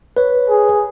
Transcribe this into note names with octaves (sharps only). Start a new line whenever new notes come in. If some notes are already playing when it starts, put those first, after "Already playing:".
B4 C#5
G#4